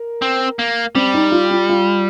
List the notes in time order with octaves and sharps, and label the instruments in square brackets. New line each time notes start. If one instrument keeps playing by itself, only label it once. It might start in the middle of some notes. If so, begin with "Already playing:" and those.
Already playing: [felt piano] A#4
[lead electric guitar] C4
A#3
[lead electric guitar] G3 [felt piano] C4
[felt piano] D#4
F4
F4
F4